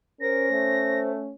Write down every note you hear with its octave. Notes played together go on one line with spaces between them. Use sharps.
C#4 A#4 C5 A#6
A3